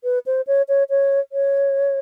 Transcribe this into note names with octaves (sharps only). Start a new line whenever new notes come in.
B4
C5
C#5
C#5
C#5
C#5